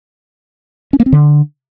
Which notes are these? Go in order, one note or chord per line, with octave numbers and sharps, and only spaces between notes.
C#4
A#3
C4
D3